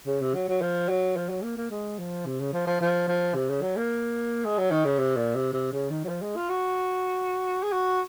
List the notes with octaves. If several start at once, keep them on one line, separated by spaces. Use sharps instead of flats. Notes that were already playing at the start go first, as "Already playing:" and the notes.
C#3
C3
F#3
F#3
F3
F#3
F3
F#3
A#3
A#3
G#3
F3
C3
C#3
F3
F3
F3
F3
C3
C#3
F#3
A#3
G#3
F#3
D#3
C#3
C3
A#2
C3
C3
C#3
D#3
F#3
F3
G#3
F4
F#4
G#4
F#4